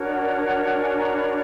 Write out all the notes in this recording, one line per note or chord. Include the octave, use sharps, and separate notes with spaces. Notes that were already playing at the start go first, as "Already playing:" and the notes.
Already playing: D4 F#4 A#4 C#5
F#5
G#5
A#5
B5